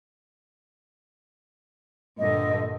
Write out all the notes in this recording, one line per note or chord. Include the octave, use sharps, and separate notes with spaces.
G2 A#2 D3 D#5